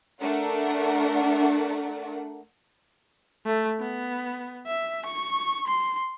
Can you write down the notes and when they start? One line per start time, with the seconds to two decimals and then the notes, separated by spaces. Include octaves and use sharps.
0.20 A3 D4 A#4 F#5
3.46 A3
3.80 B3
4.67 E5
5.05 C#6
5.67 C6